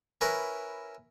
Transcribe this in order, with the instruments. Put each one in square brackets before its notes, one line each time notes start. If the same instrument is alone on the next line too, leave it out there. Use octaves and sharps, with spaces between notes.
[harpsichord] C#4 E4 A#4 B4